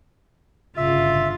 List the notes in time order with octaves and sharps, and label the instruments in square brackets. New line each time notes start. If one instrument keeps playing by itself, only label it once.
[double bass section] G1 C#3 [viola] F4 [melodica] E5